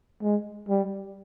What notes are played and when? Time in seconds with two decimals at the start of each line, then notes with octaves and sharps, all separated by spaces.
0.22 G#3
0.69 G3